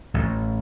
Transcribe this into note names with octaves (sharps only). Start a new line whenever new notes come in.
A1